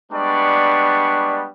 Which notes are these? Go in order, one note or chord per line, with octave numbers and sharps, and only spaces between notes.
G3 G#3 B3 D4 D5 C#6